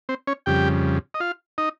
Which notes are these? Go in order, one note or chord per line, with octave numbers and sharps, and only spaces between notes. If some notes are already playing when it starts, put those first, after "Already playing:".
C4 C5
C#4 C#5
F2 C#3 G3 G4 G5
D#5
F4 F5
D#4 D#5